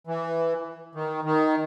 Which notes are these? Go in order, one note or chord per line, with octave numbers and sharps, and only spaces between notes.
E3
D#3
D#3